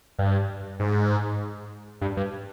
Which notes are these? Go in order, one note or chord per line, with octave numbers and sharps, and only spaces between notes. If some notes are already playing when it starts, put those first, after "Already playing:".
G2
G#2
G2
G2